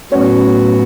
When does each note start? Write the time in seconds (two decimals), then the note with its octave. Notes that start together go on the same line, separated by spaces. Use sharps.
0.12 A2 F#3 B3 C#4 F#4 C#5